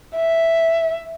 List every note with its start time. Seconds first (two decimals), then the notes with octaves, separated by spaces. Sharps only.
0.15 E5